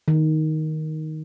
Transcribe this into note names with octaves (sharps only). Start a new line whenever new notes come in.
D#3